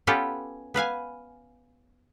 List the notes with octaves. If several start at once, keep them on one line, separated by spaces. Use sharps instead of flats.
B3 C#4 F4 G4 A4 B4
B3 B4 F5 G#5